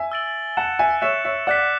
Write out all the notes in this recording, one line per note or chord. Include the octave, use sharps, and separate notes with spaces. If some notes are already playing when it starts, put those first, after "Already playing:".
Already playing: E5 G#5
E6 A6 D7 F#7
F#5 A5 F#6 C#7 E7
E5 G#5
C#5 E5 F#6 C#7 E7
C#5 E5
D5 F#5 D6 F#6 B6